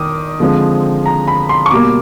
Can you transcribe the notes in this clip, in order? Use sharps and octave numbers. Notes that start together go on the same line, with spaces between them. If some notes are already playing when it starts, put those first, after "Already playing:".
Already playing: D#3 D6 D#6
D3 F3 G#3 C4
A#5
B5
C6
C#6
B2 G3 A#3 D6